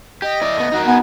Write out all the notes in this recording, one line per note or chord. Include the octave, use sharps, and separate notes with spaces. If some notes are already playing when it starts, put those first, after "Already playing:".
G4 D#5
E4 D5
A3 B3
D#4 F#4 A#4
B3 G#5